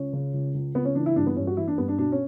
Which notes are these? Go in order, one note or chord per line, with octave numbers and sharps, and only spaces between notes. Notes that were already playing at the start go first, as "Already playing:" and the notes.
Already playing: C#2 C#4
C#3
C#2
C#2
C#2 B3
C#4
E3 D4
E4
G2 D4
B3
G2 C#4
F#4
E3 E4
D4
G2 B3
D4
B2 D4
C#4